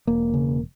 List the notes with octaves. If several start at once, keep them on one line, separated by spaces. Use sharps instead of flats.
E1 A#3
C#3